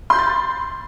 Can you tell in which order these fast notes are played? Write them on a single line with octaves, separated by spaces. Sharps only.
C6 G6 B5 A6